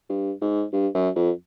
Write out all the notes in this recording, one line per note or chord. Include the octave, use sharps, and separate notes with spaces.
G2
G#2
G2
F#2
F2